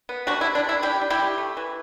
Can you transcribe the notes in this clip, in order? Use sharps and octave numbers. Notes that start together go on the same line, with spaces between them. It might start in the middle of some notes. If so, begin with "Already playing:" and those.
B3
C3 D4 F#4
E4
C3
D4
C3 E4
D4 E4 G4
G3
E4 G4
C3
A3
E3